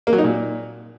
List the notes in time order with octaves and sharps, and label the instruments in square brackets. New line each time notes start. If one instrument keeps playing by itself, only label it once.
[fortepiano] A#3
F#3
D#4
A#2